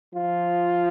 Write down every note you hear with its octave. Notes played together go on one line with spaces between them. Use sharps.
F3 F4